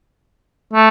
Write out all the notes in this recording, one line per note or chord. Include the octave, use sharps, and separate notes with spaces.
A3